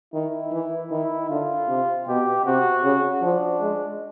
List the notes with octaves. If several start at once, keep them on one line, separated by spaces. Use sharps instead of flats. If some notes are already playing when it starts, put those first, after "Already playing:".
D#3 E4
E3
D#3 E4
D3 F4
C3
B2 G4
C3 F#4
C#3
F3 D4
G#3